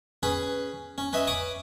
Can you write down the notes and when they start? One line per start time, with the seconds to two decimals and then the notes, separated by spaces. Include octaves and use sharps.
0.23 C#4 G#4 B4 B5
0.98 C#4
1.13 C#4 B4 D#5 E5
1.27 C#5 B5 D6 D#6